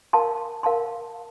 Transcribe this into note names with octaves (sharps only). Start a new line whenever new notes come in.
A#4 F5 A5 C6
A#4 F5 A5 C6